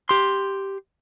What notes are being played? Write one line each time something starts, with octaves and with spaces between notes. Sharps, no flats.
G4 C6